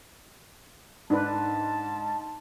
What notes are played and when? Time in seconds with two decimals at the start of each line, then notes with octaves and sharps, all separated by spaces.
1.10 G#2 D4 B4 A5